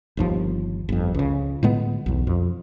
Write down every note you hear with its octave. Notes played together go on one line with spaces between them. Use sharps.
G1 D#2 F3
G1 F2
C#2 C#3
A2 D3 G#3 B3
B1 E2
F2